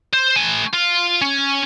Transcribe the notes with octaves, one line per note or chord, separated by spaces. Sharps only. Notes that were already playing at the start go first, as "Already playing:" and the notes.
C5
A3 G#5
F4
C#4